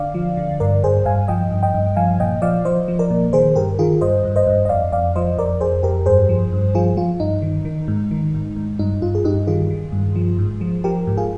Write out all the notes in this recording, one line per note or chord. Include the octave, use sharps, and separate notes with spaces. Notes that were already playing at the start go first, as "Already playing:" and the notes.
Already playing: D3 D5 F5
F3
D3
G2 A#4 D5
G2 G#4 C5
G2 F5 G#5
F3 D#5 G5
G2
D#5 G5
G2
F3 F5 G#5
A#2 D#5 G5
F3 D5 F5
F3 C5 D#5
F3
A#4 D5
A#2
D#3 G#4 C5
G2 G4 A#4
D#3 F4 G#4
G2 C5 D#5
G2
C5 D#5
G2
D#5
F2 D5 F5
F2 D5 F5
F3 C5 D#5
F2 A#4 D5
F2 G#4 C5
F2 G4 A#4
G2 G#4 C5
F3
G2
F3 F4 G#4
F3 F4
G2 D#4
D#3
D#3
G#2
D#3
G#2
G#2
G2 D#4
G2 F4
G#4
G2 D#4 G4
D#3 F4 G#4
D#3
G2
F3
G#2
F3
F3 G4 A#4
G#2
F4 G#4